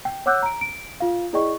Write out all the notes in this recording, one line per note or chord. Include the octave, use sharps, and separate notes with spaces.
G5
C#5 F#5 D6 E6 F#6 G6
A#5 D7
D7
F4 F5
E4 G#4 D5 D#5 G5 C#6